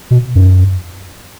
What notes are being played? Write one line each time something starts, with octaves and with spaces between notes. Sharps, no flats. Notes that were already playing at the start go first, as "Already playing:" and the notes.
B2
F#2